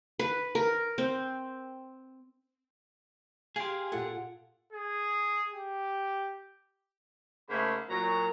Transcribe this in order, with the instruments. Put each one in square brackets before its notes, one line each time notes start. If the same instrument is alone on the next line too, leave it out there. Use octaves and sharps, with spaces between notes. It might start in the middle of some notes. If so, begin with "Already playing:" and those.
[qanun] B4
A#4
C4
[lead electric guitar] G4 G#4 [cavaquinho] F5 [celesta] G#5 C6
[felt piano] A#2 F4 A4 [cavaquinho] F#5
[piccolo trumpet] G#4
G4
[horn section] G#2 C#3 A3 A#3 F5 B5
A#2 F#3 A#5